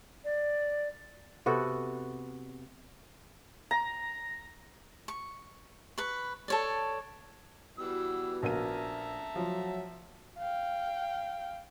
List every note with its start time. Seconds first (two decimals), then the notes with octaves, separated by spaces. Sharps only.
0.24 D5
1.46 C3 B3 F#4 A4
3.71 A#5
5.08 C#6
5.98 B4 C#6
6.48 A4 C#5 D5
7.79 E3 G3 B3 F#4 E6
8.43 A#1 A#4 E5 A5 A#5 D#7
9.36 F3 F#3
10.38 F5 G5